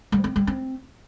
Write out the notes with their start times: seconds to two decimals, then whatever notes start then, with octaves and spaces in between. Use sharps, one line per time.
0.12 G3
0.24 C4
0.36 G3
0.47 C4